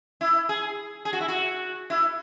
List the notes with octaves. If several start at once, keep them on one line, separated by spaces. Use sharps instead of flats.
E4
G#4
G#4
F#4
E4
F#4
E4